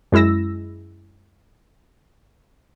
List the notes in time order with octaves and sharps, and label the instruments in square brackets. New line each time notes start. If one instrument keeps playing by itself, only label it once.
[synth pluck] F#2 G#3 E4 E6 A#6